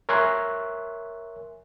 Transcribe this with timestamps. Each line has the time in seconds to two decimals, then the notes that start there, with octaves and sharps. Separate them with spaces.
0.09 A#4 C#5 E5 G#5 C6 F#6